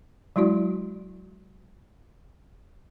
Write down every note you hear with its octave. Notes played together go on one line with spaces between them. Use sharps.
F#3 G#3 E4 F#4 D5